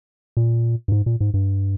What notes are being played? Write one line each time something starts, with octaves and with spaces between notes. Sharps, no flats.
A#2
G2
G#2
A#2
G#2
G2